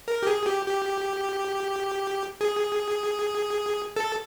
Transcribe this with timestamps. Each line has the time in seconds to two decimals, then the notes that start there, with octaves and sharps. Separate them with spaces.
0.08 A#4
0.23 G4
0.27 G#4
0.47 G4
0.66 G4
2.41 G#4
3.96 A4